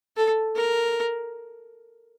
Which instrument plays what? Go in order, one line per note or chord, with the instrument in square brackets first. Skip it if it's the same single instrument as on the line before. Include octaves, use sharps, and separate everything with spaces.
[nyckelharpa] A4
A#4